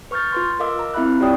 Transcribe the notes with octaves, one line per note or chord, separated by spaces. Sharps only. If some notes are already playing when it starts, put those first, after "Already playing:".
B4 C#6 F6 G6 A6
F4 B4 C6
A#4 D#5 F5 D6 E6
A#5
C4 E4 E5 F5 B5 F#6
F4 G4 C#5 D5 G5 D#6